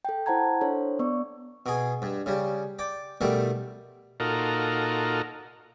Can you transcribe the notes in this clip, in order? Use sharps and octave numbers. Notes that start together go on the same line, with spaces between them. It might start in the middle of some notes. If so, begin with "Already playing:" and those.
A4 G5
E4 C5 F#5 A5 A#5 G#6
D4 A4 C5 C#5
B3 D5 C#6
B2 G#4
G2
C#3 G3
D5 G5
B2 D#3 G3 A3
A#2 D#4 F4 F#4 A4 A#4